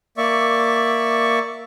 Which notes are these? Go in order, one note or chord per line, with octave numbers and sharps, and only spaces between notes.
A#3 D5 E5 C#6